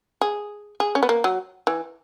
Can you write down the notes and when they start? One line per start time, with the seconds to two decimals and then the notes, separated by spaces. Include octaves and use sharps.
0.21 G#4
0.80 G#4
0.95 C#4
1.03 B3
1.09 A#3
1.24 F#3
1.67 E3